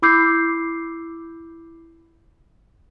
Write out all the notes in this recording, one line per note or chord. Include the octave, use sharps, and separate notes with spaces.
E4 B5 D6 E6 G6 C7